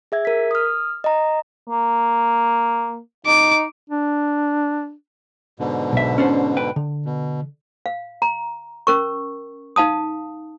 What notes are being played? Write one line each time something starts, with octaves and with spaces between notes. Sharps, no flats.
G#4 E5 G#6
A#4 B6
D#6 F6
D#5 A#5
A#3
D#4 D6
D4
G#2 B2 D3
B1 E5
C#4 D4 C5
B4 G5
D3
B2
F5
A#5
C#4 A#4 C#6
D#4 F5 A5 D#6